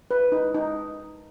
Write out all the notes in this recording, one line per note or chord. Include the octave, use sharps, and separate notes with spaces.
B4
D#4
D#4